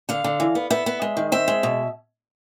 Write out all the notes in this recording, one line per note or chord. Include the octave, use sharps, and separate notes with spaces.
D3 F5
D3
E3
B3
B3 E5
B3
G#3
D#3
C4 E5
G#3
B2